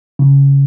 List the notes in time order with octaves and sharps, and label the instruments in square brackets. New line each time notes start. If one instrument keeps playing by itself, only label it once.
[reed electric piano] C#3